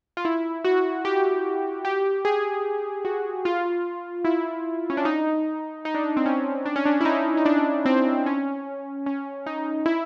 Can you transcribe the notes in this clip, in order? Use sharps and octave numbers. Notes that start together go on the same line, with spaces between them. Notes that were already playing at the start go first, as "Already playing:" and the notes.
F4
E4
F#4
G4
G4
G#4
F#4
F4
E4
C#4
D4
D#4
D#4
D4
D#4
C4
C#4
D4
C#4
D4
E4
D#4
D#4
D4
C4
C#4
C#4
D#4
E4